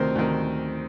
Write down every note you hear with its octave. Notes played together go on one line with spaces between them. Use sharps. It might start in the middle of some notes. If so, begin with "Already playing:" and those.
Already playing: D2 C3 D#3 A#4 C5
D2 C3 D#3